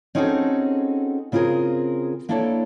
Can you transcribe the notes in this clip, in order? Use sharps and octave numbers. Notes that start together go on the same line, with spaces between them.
C4 C#4 D#4 F#4 G#4 A4
C#3 C4 F4 G4 G#4 A#4
A#3 D4 E4 A4 B4 C#5